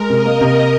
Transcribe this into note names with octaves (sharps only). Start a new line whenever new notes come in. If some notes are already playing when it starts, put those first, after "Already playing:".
Already playing: G#3 A#4
C3 D#5
A#3
C3